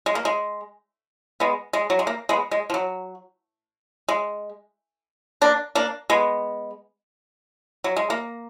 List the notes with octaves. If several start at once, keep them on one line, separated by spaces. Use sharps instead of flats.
G#3
A#3
G#3
G#3 B3
G#3
F#3
G#3
A#3
G#3 B3
G#3
F3
F#3
G#3
A#3 D4
A#3 D4
G#3 B3
F#3
G#3
A#3